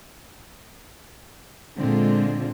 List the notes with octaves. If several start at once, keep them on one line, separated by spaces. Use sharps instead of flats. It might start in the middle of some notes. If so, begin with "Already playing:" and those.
A#2 D3 G#3 C4 F4